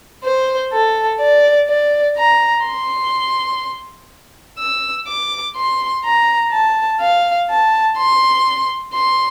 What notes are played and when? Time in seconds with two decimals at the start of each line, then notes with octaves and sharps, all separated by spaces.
0.24 C5
0.73 A4
1.21 D5
1.69 D5
2.17 A#5
2.66 C6
4.58 E6
5.08 D6
5.56 C6
6.04 A#5
6.52 A5
7.01 F5
7.50 A5
7.97 C6
8.94 C6